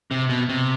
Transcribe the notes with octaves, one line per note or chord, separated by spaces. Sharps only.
C3
B2
C3